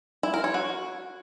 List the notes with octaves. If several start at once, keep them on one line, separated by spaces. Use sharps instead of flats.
E4
A#4
C#5
F#4